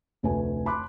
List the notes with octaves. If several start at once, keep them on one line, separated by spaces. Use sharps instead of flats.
F1 D2 A3 B4 G#5
A5 B5 C6 D6 F#6